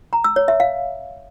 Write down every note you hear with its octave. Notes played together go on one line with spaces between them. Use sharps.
A#5
E6
C#5
E5
F5